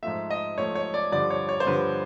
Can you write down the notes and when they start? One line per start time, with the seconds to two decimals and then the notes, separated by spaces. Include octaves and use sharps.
0.03 G#2 F3 A3 E5
0.30 D#5
0.58 G#2 F3 A3 C#5
0.75 C#5
0.94 D5
1.12 G2 D3 F3 D5
1.30 C#5
1.49 C#5
1.60 C5
1.67 G2 D3 F3 B4